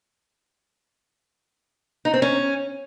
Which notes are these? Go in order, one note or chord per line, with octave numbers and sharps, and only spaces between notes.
D#4
C4
C#4